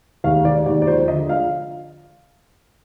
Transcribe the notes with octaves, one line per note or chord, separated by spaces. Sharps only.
D#2 F5
D#2 D5
D#2 D5
D5
F3 C5
D3 D#5
F3 F5